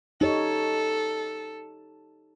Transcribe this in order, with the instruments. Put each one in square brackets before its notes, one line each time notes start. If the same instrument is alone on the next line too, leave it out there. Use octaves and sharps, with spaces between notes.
[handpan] D#4 G4 C#5 [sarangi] A4